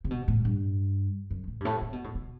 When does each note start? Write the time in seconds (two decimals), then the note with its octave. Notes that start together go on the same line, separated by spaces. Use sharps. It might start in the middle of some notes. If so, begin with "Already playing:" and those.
0.04 C3
0.11 B2
0.28 A2
0.45 G2
1.30 F#2
1.47 A2
1.60 G2
1.65 A2
1.81 C3
1.93 B2
2.04 A2
2.15 B2